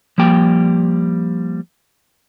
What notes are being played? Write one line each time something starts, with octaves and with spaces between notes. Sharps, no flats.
F3 G3 A#3 G5